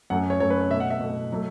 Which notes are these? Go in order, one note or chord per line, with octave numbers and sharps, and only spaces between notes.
F#2 F#3 A3 F#5
C#5
F#2 F#3 A3 C#5
B4
C#5
B2 A3 E5
F#5
E5
B2 A3
F#3 A3